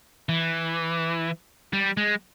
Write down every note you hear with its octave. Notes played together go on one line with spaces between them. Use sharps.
E3
G3
G#3